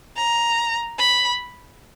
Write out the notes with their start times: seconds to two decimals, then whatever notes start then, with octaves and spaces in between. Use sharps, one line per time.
0.17 A#5
0.99 B5